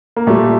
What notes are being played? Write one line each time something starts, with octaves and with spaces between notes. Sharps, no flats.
A#3
A#2 G3 A3